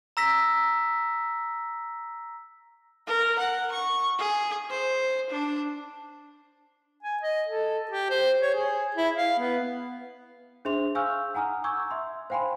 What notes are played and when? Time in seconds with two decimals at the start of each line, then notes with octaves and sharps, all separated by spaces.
0.17 A#5 E6 A#6 B6
3.07 A#4
3.39 F#5
3.72 C#6
4.18 G#4
4.70 C5
5.30 D4
7.03 G#5
7.22 D#5
7.48 A4
7.91 G4
8.10 C5
8.42 C#5
8.54 G#4
8.96 E4
9.16 F5
9.39 B3
10.65 D4 G#4 C5 E5 C6 F7
10.95 F5 G#5 C#6 E6 F6 G6
11.34 F#5 G#5 A#5 D#6 F6
11.64 G#5 C#6 D6 E6 G6 G#6
11.91 E5 C6
12.30 C5 F5 G5 G#5 B5 C6